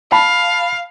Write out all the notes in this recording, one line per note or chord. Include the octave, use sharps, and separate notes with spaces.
F5 A5 B5